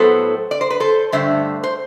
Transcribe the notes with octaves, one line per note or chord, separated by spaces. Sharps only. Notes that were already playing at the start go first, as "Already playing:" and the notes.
Already playing: A2 F#3 B3 A4 C5
D5
C5
B4
A4 C5
G2 D3 A3 C5 E5
C5